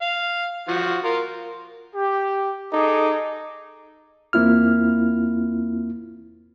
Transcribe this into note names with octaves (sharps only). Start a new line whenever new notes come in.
F5
F3 F#4
F4 A#4
G4
D#4 G#4 A4 D6
E2 A#3 C4 E4 F4 F6